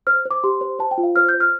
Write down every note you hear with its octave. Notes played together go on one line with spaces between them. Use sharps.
C5 F6
C5
D6
G4 C6
C5
C5 A5
G5
F4
F5
C5 F6
G6
C5
F6